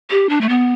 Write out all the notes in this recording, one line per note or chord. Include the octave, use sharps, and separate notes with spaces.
G4
D4
A3
B3